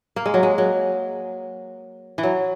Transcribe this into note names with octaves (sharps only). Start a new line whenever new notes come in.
A#3
G#3
F#3
G#3
F#3
E3
F#3